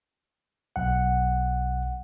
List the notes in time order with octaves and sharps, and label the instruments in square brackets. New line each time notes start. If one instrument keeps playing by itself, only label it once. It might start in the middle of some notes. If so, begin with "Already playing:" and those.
[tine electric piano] B1 F#5